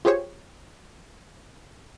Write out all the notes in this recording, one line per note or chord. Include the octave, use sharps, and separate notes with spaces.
F4 G4 G#4 C5 C#5